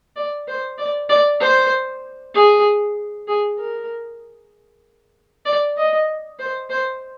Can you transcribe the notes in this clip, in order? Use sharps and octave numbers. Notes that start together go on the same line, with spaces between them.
D5
C5
D5
D5
C5
G#4
G#4
A#4
D5
D#5
C5
C5